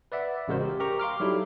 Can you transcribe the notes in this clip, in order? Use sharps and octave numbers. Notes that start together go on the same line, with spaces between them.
B4 D5 E5 F#5
A1 C#3 G#3 F#4 A#4 C5
G4
G4 A#4 A#5 C#6
F5 C6 D6 F6
F#3 G3 D#4 E4 G4 A4